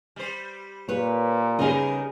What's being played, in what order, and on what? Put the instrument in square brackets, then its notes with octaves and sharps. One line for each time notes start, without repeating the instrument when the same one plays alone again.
[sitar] G3 C5
[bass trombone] A#2 [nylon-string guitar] B4 C#5
[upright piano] C#3 G3 [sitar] B3 D#4 A#4 [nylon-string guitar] G#4 D#5